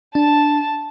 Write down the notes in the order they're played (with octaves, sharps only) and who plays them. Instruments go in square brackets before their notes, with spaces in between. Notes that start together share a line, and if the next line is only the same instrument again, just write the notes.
[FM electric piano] D4 [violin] A5